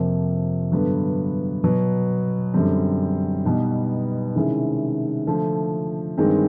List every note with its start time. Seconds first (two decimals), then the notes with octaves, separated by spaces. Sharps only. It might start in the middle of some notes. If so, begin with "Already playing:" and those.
Already playing: F2 C3 F3 A#3
0.72 G2 D3 F#3 B3
1.64 B2 F#3 B3
2.54 F#2 D3 G3 C4
3.45 B2 G3 B3 D#4
4.36 C3 D#3 G#3 C#4 E4
5.27 D3 F3 A3
6.18 G2 D#3 G#3 C4